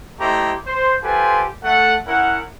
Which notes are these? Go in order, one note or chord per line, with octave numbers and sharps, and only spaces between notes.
A3 E4 G4 C5 D#5 A#5
C5
F4 G4 A4 B4 C5 G#5
A3 A4 F#5
C#4 E4 A#4 F#5